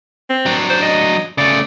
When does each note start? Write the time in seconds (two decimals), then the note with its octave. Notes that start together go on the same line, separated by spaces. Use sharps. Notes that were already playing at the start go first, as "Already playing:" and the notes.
0.30 C4
0.46 F#3 D4
0.70 C5
0.83 D#5
1.38 C#3 A3 D5